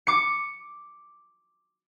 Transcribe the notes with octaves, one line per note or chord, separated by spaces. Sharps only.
D6 C#7